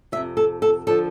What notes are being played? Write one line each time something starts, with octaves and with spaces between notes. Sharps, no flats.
F2 C3 E3 E5
A4
A4
D3 F3 A4